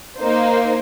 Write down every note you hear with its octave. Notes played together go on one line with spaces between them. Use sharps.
A#3 D#4 C5